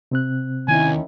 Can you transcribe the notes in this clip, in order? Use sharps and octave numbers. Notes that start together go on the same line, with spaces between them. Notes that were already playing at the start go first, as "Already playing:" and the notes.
C3 C4 F#6
D#2 D#3 C#4 E4 G#5